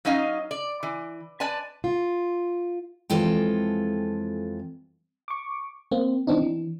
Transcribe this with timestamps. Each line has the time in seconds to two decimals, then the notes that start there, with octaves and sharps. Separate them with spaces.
0.05 F#3 C#4 D#4 D#5 F5
0.51 D5
0.83 E3
1.40 B4 D5 G#5 A5
1.84 F4
3.10 F2 E3 G#3 F4 A4 G5
5.28 C#6 D6
5.91 A#3 C4
6.27 E3 B3 C4 D4 D#4
6.42 E3